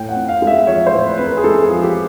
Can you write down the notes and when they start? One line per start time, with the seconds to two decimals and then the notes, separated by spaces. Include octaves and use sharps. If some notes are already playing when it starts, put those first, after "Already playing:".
Already playing: A2 G5
0.09 F#5
0.16 C4
0.28 F5
0.42 G#3
0.47 E5
0.67 F3 C#5
0.87 C5
0.93 A2
1.06 B4
1.18 C4 B4
1.25 A#4
1.37 G#4
1.44 G#3 A4
1.63 G#4
1.70 F3
1.83 G4